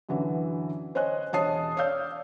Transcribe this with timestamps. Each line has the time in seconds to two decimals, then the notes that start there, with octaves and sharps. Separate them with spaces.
0.09 F#2 D3 E3 F#4
0.95 C5 C#5 D#5 G#5 F#6
1.33 E1 C#5 D#5 A5 D#6 C7
1.77 C#5 D5 F5 E6 G6